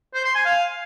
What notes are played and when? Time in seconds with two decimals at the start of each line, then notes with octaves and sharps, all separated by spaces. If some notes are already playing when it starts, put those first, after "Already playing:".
0.14 C5
0.25 C6
0.35 G#5
0.45 F5